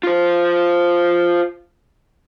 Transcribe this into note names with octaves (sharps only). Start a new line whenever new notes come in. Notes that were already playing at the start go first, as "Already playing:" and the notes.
F4 C5